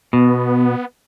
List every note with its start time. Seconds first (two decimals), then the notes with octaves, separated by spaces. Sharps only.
0.13 B2 B3